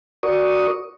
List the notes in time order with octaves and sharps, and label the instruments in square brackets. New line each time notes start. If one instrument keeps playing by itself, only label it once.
[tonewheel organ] F#4 A#4 D5 C#6 D#6